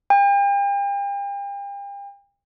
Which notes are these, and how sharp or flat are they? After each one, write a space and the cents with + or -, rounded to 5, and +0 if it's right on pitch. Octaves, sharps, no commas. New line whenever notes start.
G5 +40